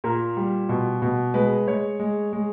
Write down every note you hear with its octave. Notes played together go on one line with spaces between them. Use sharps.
A#2 A#4
G3
B2
B2
G#3 B4
G#3 C#5
G#3
G#3